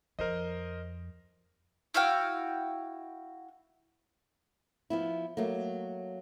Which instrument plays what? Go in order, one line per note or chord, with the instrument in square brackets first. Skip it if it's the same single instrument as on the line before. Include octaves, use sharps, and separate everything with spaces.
[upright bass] F2 [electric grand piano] A#4 C5 D#5
[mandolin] E4 F#4 F5 G5
[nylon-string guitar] F3 B3 E4
F#3 A3 A#3